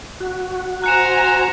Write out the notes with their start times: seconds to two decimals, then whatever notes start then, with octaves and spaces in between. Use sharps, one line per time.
0.20 F#4
0.84 C5 G#5 A#5 F#6 C#7 E7